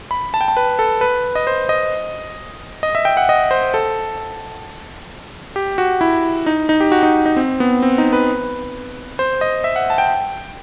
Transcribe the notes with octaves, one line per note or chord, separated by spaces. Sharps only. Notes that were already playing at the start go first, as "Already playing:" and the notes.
B5
A5
G5
A5
B4
A4
B4
D#5
C5
D#5
D#5
E5
G5
F#5
D#5
C5
A4
G4
F#4
E4
D#4
D#4
G4
F#4
D#4
D#4
C4
B3
C4
D#4
B4
C5
D#5
E5
F#5
A5
G5